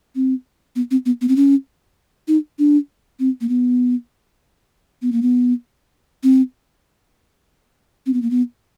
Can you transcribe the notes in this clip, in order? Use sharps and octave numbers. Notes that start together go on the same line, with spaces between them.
C4
B3
C4
B3
B3
C4
C#4
D#4
D4
C4
A#3
B3
B3
A#3
B3
C4
C4
B3
A#3
B3